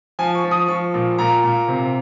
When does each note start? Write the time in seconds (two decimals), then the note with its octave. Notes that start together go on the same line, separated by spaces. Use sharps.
0.19 F3 G#5
0.35 C#6
0.44 F3
0.51 D#6
0.68 F3 C#6
0.94 A#2
1.19 A#2 A#5
1.43 A#2
1.68 C3